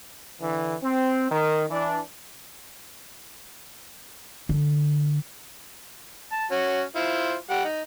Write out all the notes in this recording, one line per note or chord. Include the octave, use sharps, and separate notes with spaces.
D3 E3
C4
D#3 A#4
E3 D4
D3
A5
C#4 F#4
E4 F4 C5
G3 G4 F#5
D#4